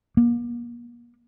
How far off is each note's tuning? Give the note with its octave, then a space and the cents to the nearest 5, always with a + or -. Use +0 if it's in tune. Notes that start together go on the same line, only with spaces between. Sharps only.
A#3 +40